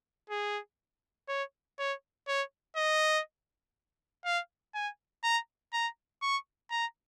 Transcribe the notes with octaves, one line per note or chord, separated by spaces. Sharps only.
G#4
C#5
C#5
C#5
D#5
F5
G#5
A#5
A#5
C#6
A#5